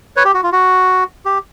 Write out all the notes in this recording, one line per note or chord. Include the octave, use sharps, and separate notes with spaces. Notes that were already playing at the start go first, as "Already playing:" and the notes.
B4 C#5
G4
F#4
F4
F#4
G4